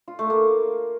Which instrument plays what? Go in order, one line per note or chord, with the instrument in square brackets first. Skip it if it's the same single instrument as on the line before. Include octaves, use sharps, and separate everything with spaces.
[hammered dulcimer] F4
A3
A#3